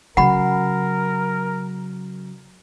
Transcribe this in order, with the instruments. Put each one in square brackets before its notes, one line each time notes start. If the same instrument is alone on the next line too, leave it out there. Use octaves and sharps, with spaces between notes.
[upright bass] C#3 F#3 [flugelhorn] A#4 [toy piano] F#5 B5